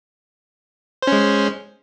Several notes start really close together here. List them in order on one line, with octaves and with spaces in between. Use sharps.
C5 C#4 G#3